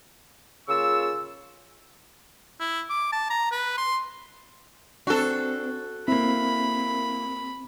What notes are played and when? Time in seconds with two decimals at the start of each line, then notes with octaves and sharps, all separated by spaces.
0.68 C#3 A#3 F4 C#6 E6
2.59 E4
2.90 D6
3.12 A5
3.30 A#5
3.51 B4
3.78 C6
5.07 C4 D4 F#4 A4
6.08 A#3 C4 E4 B5